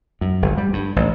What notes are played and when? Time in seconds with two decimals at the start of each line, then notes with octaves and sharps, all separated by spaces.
0.21 F#2
0.42 G1
0.57 G3
0.73 G2
0.96 A1